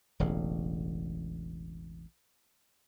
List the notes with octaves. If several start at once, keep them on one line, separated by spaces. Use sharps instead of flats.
E1 A1 C#3